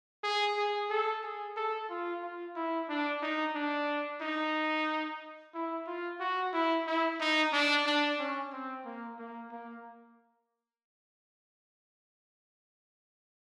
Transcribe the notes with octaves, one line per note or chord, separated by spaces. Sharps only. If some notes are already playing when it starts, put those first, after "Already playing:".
G#4
G#4
A4
G#4
A4
F4
F4
E4
D4
D#4
D4
D#4
E4
F4
F#4
E4
E4
D#4
D4
D4
C#4
C4
A#3
A#3
A#3